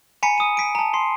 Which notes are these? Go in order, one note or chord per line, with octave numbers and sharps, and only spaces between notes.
G#5 A#5 B5 B6 C#7
D#6 D#7
B6 D7
A5 A#5
C6 C7